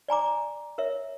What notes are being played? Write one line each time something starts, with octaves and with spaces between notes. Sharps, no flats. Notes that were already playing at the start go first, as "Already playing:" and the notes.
D5 G#5 A#5 D6
A#4 C#5 E5